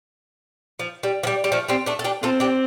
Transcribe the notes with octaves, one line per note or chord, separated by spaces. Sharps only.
F3
G3
F3
G3
G3
F3 A3
G3 C4
A3 D4
A4
D4 G4
C4 F4 A4
D4 G4